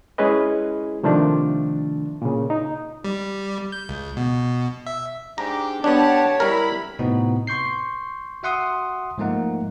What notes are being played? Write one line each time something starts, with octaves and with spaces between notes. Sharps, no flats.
G#3 C#4 E4 G#4 B4 D#5
C3 D#3 F3 A3 D4
A#2 C#3
D#4
G3
G6
C#2
B2
E5
G#2 D4 G4 A#5
B3 D4 G4 C#5 F#5 A5
G3 E4 A#4 B5
A2 C3 B3 C4 D#4 F#4
C6 C#6 G6 C7
F#4 E5 F#5 C6 D#6
G#2 F3 A3 A#3 D#4 F#5